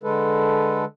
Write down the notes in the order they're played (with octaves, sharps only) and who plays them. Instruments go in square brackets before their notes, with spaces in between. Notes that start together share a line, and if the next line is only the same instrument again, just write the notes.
[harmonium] D3 G#3 A4 B4